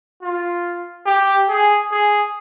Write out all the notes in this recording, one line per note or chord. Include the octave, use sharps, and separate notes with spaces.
F4
G4
G#4
G#4